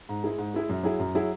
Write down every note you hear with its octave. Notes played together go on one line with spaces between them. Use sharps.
G#2
G#3 E4 G#4
G#2
G#3 E4 G#4
F#2
F#3 E4 G#4
F#2
F#3 E4 G#4